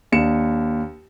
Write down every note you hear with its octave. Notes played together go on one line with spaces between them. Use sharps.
D#2 D4 C#7 E7